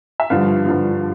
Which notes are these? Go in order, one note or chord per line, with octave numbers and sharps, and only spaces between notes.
E5
G2 D3 F3 F5
G2 D3 F3